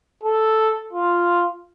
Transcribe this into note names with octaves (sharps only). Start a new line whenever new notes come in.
A4
F4